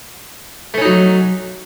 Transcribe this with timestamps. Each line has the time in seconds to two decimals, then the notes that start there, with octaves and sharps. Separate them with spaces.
0.74 A3
0.78 C#4
0.81 D#4
0.85 F#3